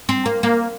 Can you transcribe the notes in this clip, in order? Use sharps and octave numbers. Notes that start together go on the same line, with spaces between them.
C4
A#3
A#3